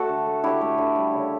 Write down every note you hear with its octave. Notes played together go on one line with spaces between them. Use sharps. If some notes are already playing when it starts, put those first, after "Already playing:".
Already playing: A3 F#4 A4
D3
A3
D3 E4 G4
A3
D3
G3
C#3